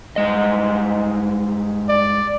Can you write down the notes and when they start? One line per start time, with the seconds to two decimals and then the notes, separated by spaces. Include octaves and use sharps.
0.16 G2 G#3 D#5
1.89 D5